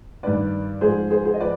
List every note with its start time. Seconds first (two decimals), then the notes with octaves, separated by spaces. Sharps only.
0.23 G2 D#3 B4 D5
0.81 G#2 F3 G#4 C5
1.10 G#4 C5
1.25 G#4 C5
1.34 D#5
1.40 F3 B4 D5